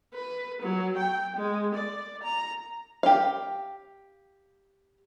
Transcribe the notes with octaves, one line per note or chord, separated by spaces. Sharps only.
B4
F#3
G5
G#3
D5
A#5
G4 F5